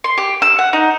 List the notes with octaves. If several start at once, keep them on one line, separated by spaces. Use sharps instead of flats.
C6
G4
E6
F#5
D#4